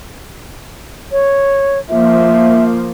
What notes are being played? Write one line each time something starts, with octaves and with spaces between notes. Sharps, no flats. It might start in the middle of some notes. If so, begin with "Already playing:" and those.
C#5
F3 A#3 E5